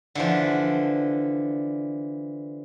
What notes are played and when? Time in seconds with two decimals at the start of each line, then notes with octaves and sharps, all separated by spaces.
0.15 D3 E3 F3